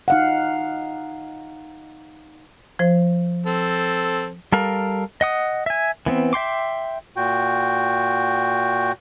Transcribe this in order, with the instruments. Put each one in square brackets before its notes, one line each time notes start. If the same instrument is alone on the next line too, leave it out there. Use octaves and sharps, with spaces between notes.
[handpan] D#4 F5 F#5
[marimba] F3 C5
[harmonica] C4 A4
[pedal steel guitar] G3 A4 A#4 F5
D#5 F#5 D#6
E5 G#5
E3 B3 C4
E5 G5 C6 D6
[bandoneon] A#2 F#4 G5